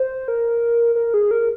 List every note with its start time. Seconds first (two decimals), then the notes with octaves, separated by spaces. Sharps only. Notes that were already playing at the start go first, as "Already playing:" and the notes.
Already playing: C5
0.28 A#4
0.95 A#4
1.14 G#4
1.31 A#4